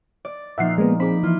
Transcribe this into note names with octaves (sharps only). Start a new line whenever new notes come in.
D5
A#2 F3 D#4 E5 F#5 C7
G#3 A#3 B3
C4 G#4 B5 D6
E3 E4 F4